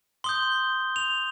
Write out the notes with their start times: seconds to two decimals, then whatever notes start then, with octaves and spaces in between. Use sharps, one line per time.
0.24 C6 D#6 G6 G7
0.96 F7